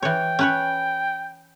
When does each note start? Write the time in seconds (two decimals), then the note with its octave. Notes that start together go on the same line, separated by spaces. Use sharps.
0.03 E3 C#5 G5
0.39 C#4 B4 C#5